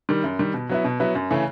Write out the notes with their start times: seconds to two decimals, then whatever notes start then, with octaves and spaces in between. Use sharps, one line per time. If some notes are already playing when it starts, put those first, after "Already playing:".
0.09 D#3 G3
0.24 F#2
0.39 D#3 G3
0.54 B2
0.69 F#3 B3 E4
0.84 B2
1.00 F#3 B3 E4
1.15 F#2
1.30 C#3 E3 A3 C#4